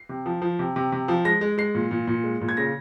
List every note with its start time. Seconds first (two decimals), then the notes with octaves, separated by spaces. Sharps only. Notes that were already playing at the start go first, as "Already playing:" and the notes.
Already playing: C7
0.09 C3
0.26 F3
0.42 F3
0.59 C3
0.76 C3
0.92 C3
1.08 F3
1.25 G#3 A#6
1.41 G#3
1.58 G#3 C7
1.75 A#2
1.91 A#2
2.07 A#2
2.24 G#3
2.41 A#2
2.49 G#6
2.57 C#3 A#6